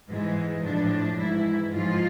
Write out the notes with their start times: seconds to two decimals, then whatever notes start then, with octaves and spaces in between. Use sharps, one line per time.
0.10 G#2 E3 G#3
0.64 A2 F3 D4
1.18 G#2 E3 E4
1.72 G#2 F3 F4